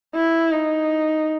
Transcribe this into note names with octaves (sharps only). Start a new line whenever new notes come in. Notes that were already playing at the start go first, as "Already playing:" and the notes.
E4
D#4